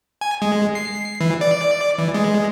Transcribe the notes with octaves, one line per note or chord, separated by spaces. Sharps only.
G#5
G#3
C7
E3
D5
E3
G#3